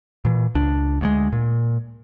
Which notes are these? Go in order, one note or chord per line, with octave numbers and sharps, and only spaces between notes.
A#2 E3
C#2 D4
D2 F#3 G#3
A#2